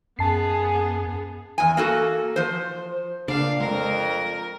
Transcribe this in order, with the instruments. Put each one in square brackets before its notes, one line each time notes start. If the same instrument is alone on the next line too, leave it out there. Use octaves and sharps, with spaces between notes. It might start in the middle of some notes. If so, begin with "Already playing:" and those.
[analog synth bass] F#2 [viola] B3 G#4 [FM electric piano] A5 C7
[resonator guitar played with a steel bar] E2 G#5
A#3 F#4 A4
F3 C5
[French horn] A#2 [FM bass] C#3 [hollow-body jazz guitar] D4 [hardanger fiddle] F5
[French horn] F2 [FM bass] G#3 [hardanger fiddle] A#4